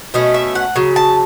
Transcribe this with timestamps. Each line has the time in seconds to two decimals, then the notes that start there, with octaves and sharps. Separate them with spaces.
0.14 B2 A3 C#4 D#5
0.34 E5
0.55 F#5
0.76 C#3 F#3
0.96 A5